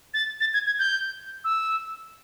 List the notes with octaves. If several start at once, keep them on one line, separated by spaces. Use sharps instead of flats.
A6
A6
G#6
G#6
G6
E6